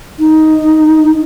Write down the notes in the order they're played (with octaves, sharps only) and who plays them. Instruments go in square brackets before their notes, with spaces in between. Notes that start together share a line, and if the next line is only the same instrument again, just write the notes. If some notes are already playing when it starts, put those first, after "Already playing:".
[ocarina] D#4